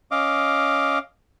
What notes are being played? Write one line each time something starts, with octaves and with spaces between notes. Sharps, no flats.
C#4 D#5 F5 D6